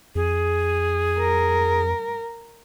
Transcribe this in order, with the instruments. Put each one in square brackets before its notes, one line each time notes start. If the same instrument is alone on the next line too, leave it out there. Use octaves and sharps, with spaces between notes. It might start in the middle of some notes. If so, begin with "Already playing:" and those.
[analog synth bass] F2 [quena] G#4
[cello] A#4